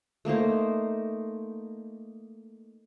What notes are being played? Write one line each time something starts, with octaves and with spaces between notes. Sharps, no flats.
A3 A#3 D#4 C5